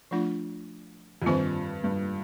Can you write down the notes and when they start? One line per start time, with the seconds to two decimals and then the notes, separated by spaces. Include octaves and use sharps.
0.11 F3 A3 D4 F4
1.22 F2
1.26 G2 D#3 G3 C4 F4 C5
1.84 G2